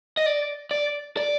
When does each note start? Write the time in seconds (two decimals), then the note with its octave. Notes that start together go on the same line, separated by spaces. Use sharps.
0.17 D#5
0.26 D5
0.71 D5
1.17 D5